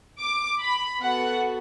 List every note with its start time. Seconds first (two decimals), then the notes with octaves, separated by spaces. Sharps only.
0.18 D6
0.60 B5
1.02 B3 F#4 A4 F#5